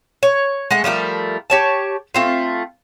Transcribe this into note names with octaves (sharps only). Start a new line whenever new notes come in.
C#5
G#3 A3 F#5
F3 G3 A3 A#4
G4 C#5 A5
A3 C4 F4